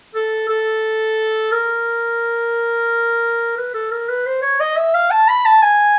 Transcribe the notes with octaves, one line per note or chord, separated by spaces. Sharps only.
A4
A4
A#4
B4
A4
A#4
B4
C5
C#5
D#5
E5
F5
A5
B5
A5
G#5